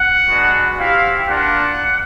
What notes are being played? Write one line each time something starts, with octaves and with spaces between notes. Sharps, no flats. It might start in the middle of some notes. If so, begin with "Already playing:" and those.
Already playing: F#5
G#3 B3 D4 F#4
C4 E4 G4 F5
A#3 D4 F4 F#5